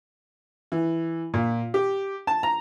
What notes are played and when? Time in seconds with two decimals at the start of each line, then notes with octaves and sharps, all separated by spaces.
0.72 E3
1.34 A#2
1.74 G4
2.27 A5
2.43 A#5